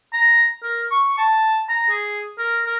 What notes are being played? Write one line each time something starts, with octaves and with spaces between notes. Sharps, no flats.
A#5
A#4
C#6
A5
A#5
G#4
A#4
A#4